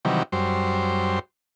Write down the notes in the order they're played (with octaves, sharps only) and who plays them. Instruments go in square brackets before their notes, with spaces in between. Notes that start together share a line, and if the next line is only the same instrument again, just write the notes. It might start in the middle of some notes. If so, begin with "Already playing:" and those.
[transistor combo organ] C3 D#3 E3 F#3 G3
F#2 G3 C5